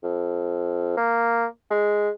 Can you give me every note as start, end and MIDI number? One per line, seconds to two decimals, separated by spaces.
0.03 0.93 41
0.97 1.46 58
1.70 2.10 56